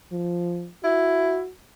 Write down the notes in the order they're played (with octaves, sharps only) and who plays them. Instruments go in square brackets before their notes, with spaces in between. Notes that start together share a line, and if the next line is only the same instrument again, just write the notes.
[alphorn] F3
[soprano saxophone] E4 [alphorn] F#4